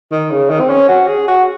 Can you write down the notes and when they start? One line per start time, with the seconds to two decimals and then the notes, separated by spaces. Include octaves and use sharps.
0.12 D#3
0.31 C#3
0.50 D#3
0.60 C4
0.70 C#4
0.88 F#4
1.08 G#4
1.28 F#4